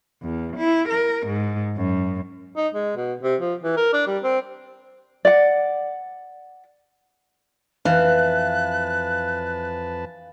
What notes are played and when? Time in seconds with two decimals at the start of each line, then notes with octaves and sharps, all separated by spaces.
0.23 E2
0.57 E4
0.89 A#4
1.27 G#2
1.77 F#2
2.57 D#4
2.75 G#3
2.96 B2
3.23 C3
3.41 F3
3.63 E3
3.77 A#4
3.93 D4
4.07 G3
4.23 C4
5.25 D5 F#5
7.85 F2 E3 B4 F5 A5 F#6